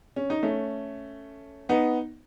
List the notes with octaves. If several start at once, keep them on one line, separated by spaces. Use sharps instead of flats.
C#4
D#4
A3 C#4
B3 D#4